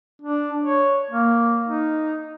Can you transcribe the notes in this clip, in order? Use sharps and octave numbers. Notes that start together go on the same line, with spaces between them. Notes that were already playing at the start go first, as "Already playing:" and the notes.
D4
C#5
A#3
D#4